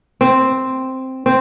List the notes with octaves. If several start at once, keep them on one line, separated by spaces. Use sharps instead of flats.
C4
C4